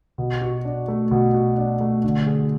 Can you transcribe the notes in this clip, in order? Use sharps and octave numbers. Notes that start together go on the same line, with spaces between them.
B2
F#4
D4
A3
B2
F#4
D4
A3
D3
G#4